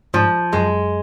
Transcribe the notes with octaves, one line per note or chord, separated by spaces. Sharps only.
G#2 F3
F#2 G#3